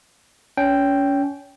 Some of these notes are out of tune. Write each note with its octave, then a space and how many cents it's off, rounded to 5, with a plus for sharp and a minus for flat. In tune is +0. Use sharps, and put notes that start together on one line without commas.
C#4 +25 G5 +0